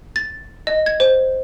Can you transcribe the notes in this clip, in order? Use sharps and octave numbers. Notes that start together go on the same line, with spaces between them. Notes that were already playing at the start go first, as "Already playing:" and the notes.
A6
D#5
G#6
C5